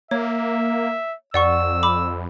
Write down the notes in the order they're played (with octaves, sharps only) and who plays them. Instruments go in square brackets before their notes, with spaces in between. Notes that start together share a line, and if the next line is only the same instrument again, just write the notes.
[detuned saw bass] A#3 [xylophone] C#5 [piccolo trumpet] E5
[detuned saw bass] F2 [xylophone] D5 F#5 C#6 [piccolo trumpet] E6
[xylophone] B5 D6